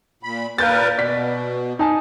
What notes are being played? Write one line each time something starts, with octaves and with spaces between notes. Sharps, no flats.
A#2 B5
A#2 A#4 B4 F5 G6 A6
B2 D5 B6
D#4 G#5 A5